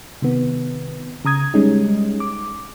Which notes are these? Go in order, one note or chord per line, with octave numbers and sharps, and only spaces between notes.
C3 D#3 B3
C#3 A#5 D#6 G#6
G3 G#3 C#4 D#4
D6